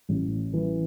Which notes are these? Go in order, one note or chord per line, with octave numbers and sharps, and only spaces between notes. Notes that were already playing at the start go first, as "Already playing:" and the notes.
A1
E3